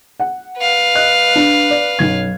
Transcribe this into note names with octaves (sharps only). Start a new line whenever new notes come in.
F#5
B4 F5
D#5 F#6
D4
D5
B1 F#2 G#6